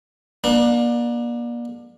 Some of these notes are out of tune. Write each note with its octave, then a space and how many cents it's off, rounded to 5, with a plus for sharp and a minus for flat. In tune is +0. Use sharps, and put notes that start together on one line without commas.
A#3 +40 D4 +20